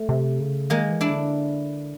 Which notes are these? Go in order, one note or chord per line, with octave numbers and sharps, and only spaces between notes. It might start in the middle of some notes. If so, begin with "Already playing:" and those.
Already playing: A3
C3
C#3
D#3 G#3 A#3
E3
D4 E4
D3